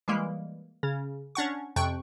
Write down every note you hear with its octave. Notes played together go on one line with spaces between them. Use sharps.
E3 G3 G#3 A#3
C#3
C#4 D4 F#5 C#6
F2 C3 G5 C#6 F#6